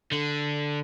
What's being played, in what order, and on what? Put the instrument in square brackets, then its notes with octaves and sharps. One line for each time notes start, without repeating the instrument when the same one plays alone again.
[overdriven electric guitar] D3